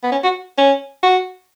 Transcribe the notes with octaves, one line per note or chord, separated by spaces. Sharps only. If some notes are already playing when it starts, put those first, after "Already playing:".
B3
C#4
F#4
C#4
F#4